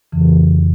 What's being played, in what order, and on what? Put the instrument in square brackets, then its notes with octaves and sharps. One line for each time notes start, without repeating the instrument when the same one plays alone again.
[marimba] F2 C#3 E3